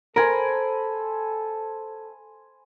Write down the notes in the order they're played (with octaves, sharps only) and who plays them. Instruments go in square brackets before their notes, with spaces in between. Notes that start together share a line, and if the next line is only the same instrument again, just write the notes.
[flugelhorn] A4 [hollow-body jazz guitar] A#4 [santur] C5 G#5 B5